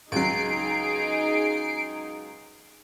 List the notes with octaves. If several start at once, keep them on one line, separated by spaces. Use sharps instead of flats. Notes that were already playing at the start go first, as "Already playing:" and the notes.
C#2 F#3 D#4 G#4 C7 D7